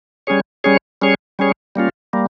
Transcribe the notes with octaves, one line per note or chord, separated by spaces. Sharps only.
G3 C#4 G#4 C#5
G3 C#4 G#4 C#5
G3 C#4 G#4 C#5
G3 C#4 G#4 C#5
G3 A#3 C#4 F4
G3 A#3